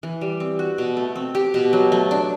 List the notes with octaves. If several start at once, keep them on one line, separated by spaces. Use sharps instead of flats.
E3
G3
C4
F#4
B2
A3
C4
G4
B2
F#3
A3
D4